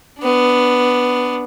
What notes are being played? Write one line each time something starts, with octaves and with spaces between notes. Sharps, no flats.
B3 D4